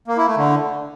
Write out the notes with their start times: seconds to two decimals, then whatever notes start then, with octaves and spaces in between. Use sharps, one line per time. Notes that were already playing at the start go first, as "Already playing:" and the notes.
0.08 A#3
0.17 E4
0.27 A3
0.37 D3